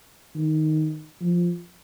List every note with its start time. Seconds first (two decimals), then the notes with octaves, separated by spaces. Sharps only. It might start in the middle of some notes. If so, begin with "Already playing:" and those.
0.36 D#3
1.21 F3